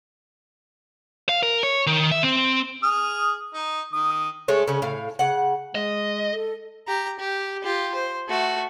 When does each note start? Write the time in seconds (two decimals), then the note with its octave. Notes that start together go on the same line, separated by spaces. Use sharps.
1.29 F5
1.43 A#4
1.63 C#5
1.87 D#3
2.12 E5
2.23 C4
2.83 G#4 D#6 F6
3.54 D#4
3.93 D#3 D#6
4.48 G#3 A3 C#5
4.68 C#3 C#4
4.82 A2 F5
5.19 C#3 F#5
5.75 G#3 D#5
6.32 A4
6.87 G4 A#5
7.19 G4
7.63 F4 G4
7.95 C5
8.28 A3 F#4